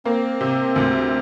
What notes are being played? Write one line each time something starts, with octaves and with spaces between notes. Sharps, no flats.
A#3 C4
C3
D2